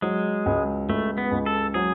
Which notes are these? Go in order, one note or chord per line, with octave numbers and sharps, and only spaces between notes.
F#3 G#3
C#2
C#2 A3
B3
C#2
A4
F#3 G#4